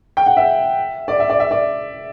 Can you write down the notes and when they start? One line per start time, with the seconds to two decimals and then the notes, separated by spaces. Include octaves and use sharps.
0.17 G5
0.26 F#5
0.37 E5
1.08 D5
1.20 E5
1.30 D5
1.40 E5
1.51 D5